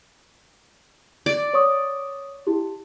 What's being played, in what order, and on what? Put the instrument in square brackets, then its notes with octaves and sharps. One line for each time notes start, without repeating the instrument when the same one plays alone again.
[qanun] D5
[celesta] C#5 C#6 D#6
E4 G4